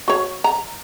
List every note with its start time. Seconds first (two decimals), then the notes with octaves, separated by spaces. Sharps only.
0.08 F#4 C#5
0.44 A#5